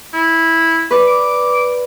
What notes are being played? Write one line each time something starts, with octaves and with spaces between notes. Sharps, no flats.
E4
B4 D5
D6